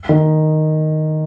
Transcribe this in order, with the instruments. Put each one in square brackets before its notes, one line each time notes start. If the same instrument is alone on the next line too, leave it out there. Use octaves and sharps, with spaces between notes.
[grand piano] D#3